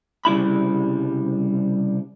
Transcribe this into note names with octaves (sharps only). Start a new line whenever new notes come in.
C2 C#3 G3 E4 E5 B5